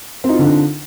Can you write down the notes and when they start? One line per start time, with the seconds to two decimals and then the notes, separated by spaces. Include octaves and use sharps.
0.24 C4
0.29 D#4
0.34 F4
0.39 D3
0.44 D4